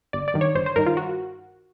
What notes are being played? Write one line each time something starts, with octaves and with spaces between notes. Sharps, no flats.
G1 D5
D5
G2 D#3
C#5
G1 C5
C5
G2 D#3 A#4
F4
F#4